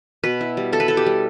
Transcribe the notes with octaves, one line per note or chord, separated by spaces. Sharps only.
B2 B4
E4
G3
E4 A4
B4
E4 A4
G4
G3